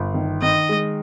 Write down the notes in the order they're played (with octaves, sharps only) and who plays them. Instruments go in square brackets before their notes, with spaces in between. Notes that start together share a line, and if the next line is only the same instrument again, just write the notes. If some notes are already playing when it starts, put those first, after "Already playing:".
Already playing: [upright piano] G1
D#3
[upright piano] D#3 [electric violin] D#5
[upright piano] G#3